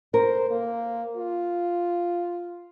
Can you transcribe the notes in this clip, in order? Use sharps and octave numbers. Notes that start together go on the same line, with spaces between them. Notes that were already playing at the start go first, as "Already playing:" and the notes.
A#4 C5
A#3
F4